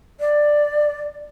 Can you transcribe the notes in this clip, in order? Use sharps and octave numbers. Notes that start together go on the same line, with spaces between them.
D5